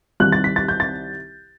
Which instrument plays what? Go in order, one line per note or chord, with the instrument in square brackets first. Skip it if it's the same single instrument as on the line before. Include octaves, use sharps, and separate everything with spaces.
[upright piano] C2 C3 D#3 F#6
A6
B6
A6
G6
A6